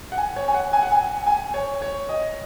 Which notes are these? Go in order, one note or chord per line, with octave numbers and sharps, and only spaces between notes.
F#5
G#5
C#5
G#5
F#5
G#5
F#5
G#5
G#5
C#5
C#5
D#5